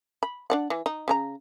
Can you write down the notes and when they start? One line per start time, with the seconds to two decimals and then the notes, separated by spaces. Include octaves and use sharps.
0.23 B5
0.50 D4 D5 F#5
0.70 E3
0.86 D#4
1.08 C#3 C#4 A#5